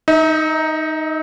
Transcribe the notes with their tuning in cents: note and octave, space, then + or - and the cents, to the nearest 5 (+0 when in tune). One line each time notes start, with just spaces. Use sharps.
D#4 +0 E5 -45